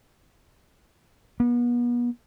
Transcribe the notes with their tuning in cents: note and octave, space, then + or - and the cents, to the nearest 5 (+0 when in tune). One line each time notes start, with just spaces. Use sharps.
B3 -40